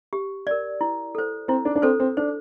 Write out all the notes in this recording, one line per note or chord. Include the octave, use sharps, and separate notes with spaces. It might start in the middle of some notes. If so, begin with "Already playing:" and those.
G4
A#4 D5
E4
A4 C5
C4 E4
D4
D4
C4 A4 C5
C4
D4 C5